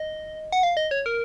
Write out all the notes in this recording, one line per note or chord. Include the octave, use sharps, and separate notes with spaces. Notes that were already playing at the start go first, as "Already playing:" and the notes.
Already playing: D#5
F#5
F5
D#5
C#5
A#4